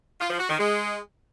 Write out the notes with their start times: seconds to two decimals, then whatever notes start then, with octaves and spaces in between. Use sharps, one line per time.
0.20 F4
0.30 F3
0.39 F#4
0.49 D#3
0.59 G#3